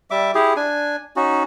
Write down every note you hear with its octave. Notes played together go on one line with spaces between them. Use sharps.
G3 E5 D6
E4 G4 G#4
D4 G#5
C#4 D#4 F#4